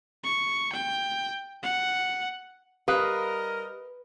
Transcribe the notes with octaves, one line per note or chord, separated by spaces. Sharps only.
C#6
G5
F#5
G3 G4 A#4 B4 D#5 F5 D#6 F#6